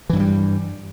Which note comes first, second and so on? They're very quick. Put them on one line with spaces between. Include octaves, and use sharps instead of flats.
E3 G2 F#3 G3